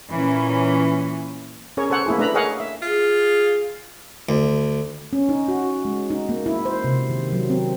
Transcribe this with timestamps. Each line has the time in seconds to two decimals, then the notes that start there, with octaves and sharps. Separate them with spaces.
0.11 A#2 E3 C#4
1.77 C#4 G#4 A#4 C#5
1.90 A4 C5 C#5 F#5
2.06 A#3 E4 G#4
2.18 A3 D4 B4 A#5 B5
2.34 G#4 A#4 C#5 D#5 F5 F#5
2.60 E5
2.82 F4 G#4
4.29 D2
5.13 C#4
5.29 D#4
5.48 F#4
5.85 G#3
6.10 D#4
6.29 A#3
6.46 E4
6.65 C5
6.84 C3
7.10 D#3
7.32 F#3
7.50 C4